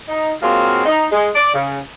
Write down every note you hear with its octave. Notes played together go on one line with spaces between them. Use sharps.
D#4
F#3 G#3 A#3 C4 F4 F#4
D#4
G#3
D5
C#3